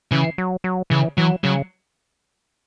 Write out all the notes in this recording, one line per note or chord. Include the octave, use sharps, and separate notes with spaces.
C#3 E3
F#3
F#3
C#3 E3
E3 F#3
C#3 F#3